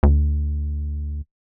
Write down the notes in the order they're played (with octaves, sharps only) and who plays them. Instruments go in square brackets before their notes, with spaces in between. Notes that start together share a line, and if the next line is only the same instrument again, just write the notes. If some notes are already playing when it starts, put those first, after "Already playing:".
[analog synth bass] D2